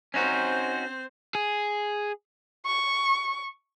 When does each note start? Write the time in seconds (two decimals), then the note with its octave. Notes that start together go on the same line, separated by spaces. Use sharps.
0.14 C4 C#4 D#4 F#4 C5
1.35 G#4
2.66 C#6